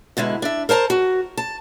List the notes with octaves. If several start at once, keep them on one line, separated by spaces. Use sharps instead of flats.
B2 D3 G#3 E4
D4 E5
A#4 C5 A5 A#5
F#4
A5